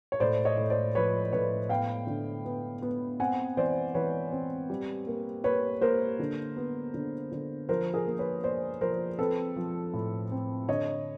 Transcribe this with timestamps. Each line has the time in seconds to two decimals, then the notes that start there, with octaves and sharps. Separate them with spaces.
0.12 C#5
0.20 A2 C5 D5
0.45 C#5 D#5
0.57 A2
0.70 C5 D5
0.95 F3 B4 C#5
1.33 A2 B4 C#5
1.69 B3 F5 G5
2.07 D3
2.45 B3
2.82 B3
3.20 C4 F#5 G#5
3.57 E3 C5 D5
3.94 E3 B4 C#5
4.32 C4
4.70 G3
5.07 A#3
5.44 A#3 B4 C#5
5.81 A#3 A#4 C5
6.19 D3
6.57 B3
6.94 D3
7.32 D3
7.69 F3 A#4 C5
7.94 G#4 A#4
8.07 A#3
8.19 B4 C#5
8.44 A#3 C5 D5
8.81 F3 A#4 C5
9.19 C4 A4 B4
9.56 F3
9.94 A2
10.31 C4
10.68 D3 C#5 D#5